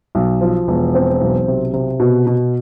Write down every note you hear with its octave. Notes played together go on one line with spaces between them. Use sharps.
B1
F3
E1
C4
B1
C3
C3
B2
B2